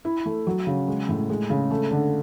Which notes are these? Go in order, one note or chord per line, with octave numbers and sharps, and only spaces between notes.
E4
A3
F#3
C#3
G#3
A2
G#3
C#3
A3
D3